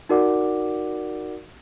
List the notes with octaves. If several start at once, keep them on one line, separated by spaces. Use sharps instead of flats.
D#4 F#4 A#4 D5 F#5 D6